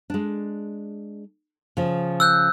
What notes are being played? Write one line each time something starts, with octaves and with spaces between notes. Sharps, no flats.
G#3 D4
C#3 F3
E6 F#6 G6